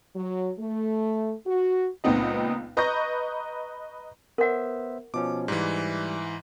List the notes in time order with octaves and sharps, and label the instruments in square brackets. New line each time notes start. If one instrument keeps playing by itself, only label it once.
[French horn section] F#3
A3
F#4
[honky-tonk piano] C#2 A#2 B3 C4 D#4 D#5
B4 D#5 A#5 C#6 G6 A#6
[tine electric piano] B3 C5 E5 [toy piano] A#4 F#5
[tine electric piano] B2 F3 C#4 [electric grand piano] D6
[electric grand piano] G#2 E3 [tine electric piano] G3